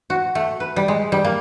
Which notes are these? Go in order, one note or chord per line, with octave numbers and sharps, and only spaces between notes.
F#4
A3
B4
G3
G#3
G3
A#3